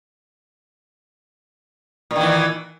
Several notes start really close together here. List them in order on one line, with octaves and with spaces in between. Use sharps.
A#2 D#3 E3